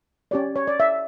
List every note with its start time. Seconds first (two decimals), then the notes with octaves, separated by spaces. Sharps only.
0.31 C#4 G4 C#5 D5
0.56 C#5
0.67 D5
0.80 E5